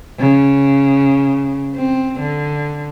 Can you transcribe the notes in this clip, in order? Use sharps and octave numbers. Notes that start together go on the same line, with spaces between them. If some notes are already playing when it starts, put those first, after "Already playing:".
C#3
C4
D3